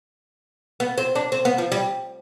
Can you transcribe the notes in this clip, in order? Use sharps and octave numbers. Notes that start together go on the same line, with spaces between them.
B3
C4
D4
C4
B3
F3
G3